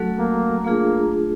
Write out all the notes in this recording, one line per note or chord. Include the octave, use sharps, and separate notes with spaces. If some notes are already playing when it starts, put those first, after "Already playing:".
Already playing: F#3 A3 C#4 F#4 A4
A#3
A3 A#3 D4 F4 G#4